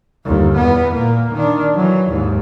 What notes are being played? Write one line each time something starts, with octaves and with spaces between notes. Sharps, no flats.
G1 D#2
E2 B3
A#2 A#3
D#3 D4
E3 F#3
D#2 G#2